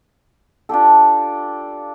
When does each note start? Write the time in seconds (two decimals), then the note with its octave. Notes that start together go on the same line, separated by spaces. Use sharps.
0.69 D4 F4 G4 A4